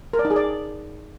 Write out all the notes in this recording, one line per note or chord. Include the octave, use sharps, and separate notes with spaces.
A#4
D5
D#4
G#4
D5